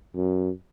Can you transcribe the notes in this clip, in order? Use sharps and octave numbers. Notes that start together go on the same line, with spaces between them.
F#2